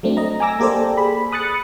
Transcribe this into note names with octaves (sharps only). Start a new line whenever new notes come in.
F#3 A3 C4 D4
D#5 A#5
G#5 A#5 D6 E6 A#6
A#3 G4 A4 C5 D5
G#4 B5
B5 D#6 F#6 A6 C#7